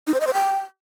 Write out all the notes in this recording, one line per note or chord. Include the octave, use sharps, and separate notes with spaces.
D#4
C5
D#5
C5
G5